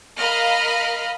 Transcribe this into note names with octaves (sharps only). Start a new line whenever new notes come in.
A#4 D#5 F5 B5 F6